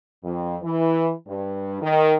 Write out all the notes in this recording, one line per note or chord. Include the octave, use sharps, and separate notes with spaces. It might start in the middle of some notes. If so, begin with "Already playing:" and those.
F2
E3
G2
D#3